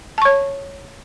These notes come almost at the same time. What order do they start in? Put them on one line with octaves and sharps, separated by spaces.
A5 C#6 C#5